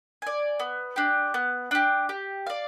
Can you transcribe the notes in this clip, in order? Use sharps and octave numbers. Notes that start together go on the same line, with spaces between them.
D5 G#5
B3
D4 G4
B3
D4 G4
G4
D5 F5